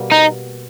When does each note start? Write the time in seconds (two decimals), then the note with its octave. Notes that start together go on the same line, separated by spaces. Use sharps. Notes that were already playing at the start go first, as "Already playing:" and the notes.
Already playing: B2 G3 A#3
0.12 D#4